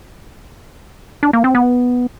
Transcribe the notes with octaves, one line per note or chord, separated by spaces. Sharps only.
D4
A#3
C4
B3